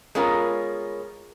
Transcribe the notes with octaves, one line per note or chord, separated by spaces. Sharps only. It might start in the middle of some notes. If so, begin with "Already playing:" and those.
G#3 B3 C#4 F4 A#4